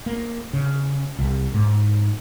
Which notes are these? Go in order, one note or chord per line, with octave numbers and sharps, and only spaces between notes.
A#3
C#3
C2
G#2